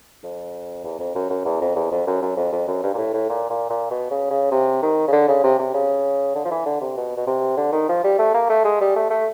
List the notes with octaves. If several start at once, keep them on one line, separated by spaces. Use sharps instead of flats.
F2
E2
F2
F#2
F#2
E2
F2
E2
F2
F#2
F#2
F2
F2
F#2
G2
A#2
A2
A2
A#2
A#2
A#2
B2
C#3
C#3
C3
D#3
C#3
D3
C#3
C3
C3
C#3
D3
F3
E3
D3
C3
B2
B2
C3
D3
D#3
F3
G3
A3
A#3
A3
G#3
G3
A3
A3